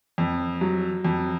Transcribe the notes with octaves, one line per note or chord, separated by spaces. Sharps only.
F2
F#3
F2